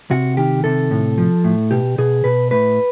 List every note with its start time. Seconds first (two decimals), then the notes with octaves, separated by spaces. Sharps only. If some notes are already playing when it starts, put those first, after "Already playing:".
0.10 C3 F#4
0.37 D#3 G4
0.64 C3 A4
0.91 A2
1.18 F3
1.44 A2
1.71 B2 G4
1.98 B2 G#4
2.24 B2 B4
2.51 A2 B4